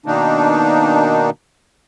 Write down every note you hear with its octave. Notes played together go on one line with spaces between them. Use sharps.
B2 D#3 A#3 D4 D#4